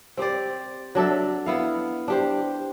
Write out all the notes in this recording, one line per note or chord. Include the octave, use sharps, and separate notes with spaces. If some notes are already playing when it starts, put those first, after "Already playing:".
C4 G4 C5 D5
F#3 D4 A4 E5
B3 E4 F5
D4 G4 C5